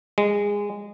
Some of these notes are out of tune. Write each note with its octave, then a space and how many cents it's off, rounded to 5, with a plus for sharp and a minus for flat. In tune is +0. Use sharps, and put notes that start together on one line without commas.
G#3 -20